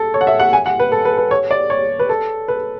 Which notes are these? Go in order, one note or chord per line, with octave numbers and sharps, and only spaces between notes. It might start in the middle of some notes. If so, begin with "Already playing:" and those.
Already playing: A4
C#5
F#5
E5
F#5
G#5
F#5
B4
A4
B4
B4
C#5
D5
C#5
B4
A4
B4